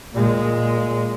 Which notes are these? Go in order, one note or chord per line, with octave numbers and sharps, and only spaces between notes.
A#2 G#3